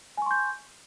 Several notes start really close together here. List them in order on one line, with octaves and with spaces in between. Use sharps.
G#5 C#6 C6 G6